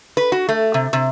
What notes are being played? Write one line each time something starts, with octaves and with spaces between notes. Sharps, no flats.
B4
F#4
A3
C3
C3